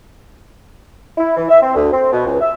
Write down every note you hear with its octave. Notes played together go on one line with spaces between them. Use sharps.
E4
E3
E5
C4
D2
C4
B2
C#2
E5